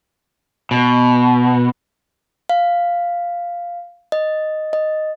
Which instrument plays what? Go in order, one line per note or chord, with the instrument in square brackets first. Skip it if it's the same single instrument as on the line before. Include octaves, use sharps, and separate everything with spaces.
[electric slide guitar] B2
[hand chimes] F5
D#5
D#5